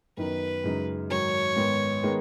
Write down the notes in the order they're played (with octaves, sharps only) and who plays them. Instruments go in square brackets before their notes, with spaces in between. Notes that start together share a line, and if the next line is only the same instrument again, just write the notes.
[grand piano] F#2 D#3 B3 D#4 [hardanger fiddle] B4
[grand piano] F#2 C#3 G#3 D#4
[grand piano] G#2 D#3 F#3 [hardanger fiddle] C#5
[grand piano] G#2 D#3 B3
D#3 G#3 B3 D#4